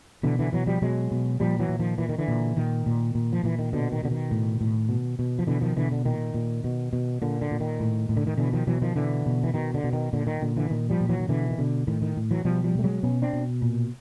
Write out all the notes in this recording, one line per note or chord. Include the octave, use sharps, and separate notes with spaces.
B2 D3 E3
D3 E3
B2 E3 F#3
F3 G3
B2 F#3 G#3
B2
A#2 F3 G3
E3 F#3
A#2
D#3 F3
A#2 E3
D#3
D3 E3
A#2
A#2 D#3
A#2
A#2
F3
A#2 E3
D#3
B2 D3
D#3
B2 D3
D#3
A2
A2
B2
B2
F3
B2 D3 E3
D#3 F3
B2 D3 E3
D3
A#2 D#3
A#2
B2
B2
A#2 D3
D3
A#2
D#3
A2
A2
D3
D#3
B2 D3 E3
D#3 F3
B2 E3 F#3
D#3 F3
B2 D3 E3
B2
E3
B2 D#3
D3
B2
D#3
A#2 D3
D#3
A#2 D3
D3 E3
A#2 D#3
F3 G3
A#2
E3 F#3
D#3
B2 D3 E3
D#3
B2 D3
A2 D#3
D#3
A2
E3 F#3
B2 F3 G3
F3 G3
B2 A3
F#3 G#3
B2 B3 C#4
C4 D4
B2
A#2